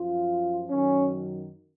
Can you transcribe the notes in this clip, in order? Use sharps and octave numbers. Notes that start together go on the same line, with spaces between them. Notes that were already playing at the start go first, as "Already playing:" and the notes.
Already playing: F#2 F3 F4
F#2 D#3 F#3 C#4